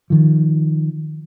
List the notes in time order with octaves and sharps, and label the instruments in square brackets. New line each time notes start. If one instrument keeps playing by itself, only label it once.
[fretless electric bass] D#3 F3